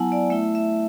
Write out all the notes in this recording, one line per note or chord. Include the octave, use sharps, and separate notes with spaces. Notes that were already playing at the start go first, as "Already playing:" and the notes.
Already playing: F#3 B3 E4 F#5 G#5 A5
D5
A3 E4 E5
E5